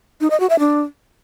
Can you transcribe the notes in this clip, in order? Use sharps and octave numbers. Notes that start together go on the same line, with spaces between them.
D#4
D#5
F#4
E5
D4